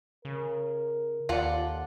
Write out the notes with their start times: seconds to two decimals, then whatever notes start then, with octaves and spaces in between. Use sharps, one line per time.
0.25 C#3 A#4
1.29 D#2 F4 A4 D5 F#5